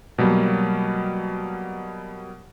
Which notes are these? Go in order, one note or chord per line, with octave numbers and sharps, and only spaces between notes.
B2 F#3 G3 A#3